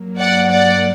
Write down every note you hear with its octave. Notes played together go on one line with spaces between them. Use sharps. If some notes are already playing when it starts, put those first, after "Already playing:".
Already playing: G2 F#3 A#3
D5 F#5
D5 F#5